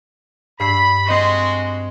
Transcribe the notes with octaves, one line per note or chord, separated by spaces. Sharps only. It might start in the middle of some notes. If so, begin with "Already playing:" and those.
G2 B5 E6 C7
G#3 C4 F#4 D#5 C6 C7